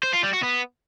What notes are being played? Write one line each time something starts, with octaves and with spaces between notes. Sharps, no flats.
C5
F4
G3
F#4
B3